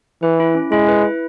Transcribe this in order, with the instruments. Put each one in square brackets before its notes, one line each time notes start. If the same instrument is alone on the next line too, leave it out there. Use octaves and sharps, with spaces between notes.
[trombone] E3 [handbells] B4
[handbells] E4
C#4
[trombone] G#3 [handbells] E4
[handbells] B4
E4